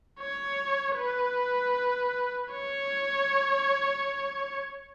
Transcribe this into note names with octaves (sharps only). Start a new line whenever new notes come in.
C#5
B4
C#5